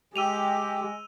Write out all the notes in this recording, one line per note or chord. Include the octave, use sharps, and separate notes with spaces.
G#3 G4 E6 D#7 F7